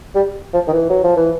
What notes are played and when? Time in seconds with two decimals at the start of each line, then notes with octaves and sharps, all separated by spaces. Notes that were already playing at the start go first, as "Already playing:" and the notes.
0.15 G3
0.53 F3
0.68 D#3
0.73 E3
0.90 F#3
1.04 F3
1.16 E3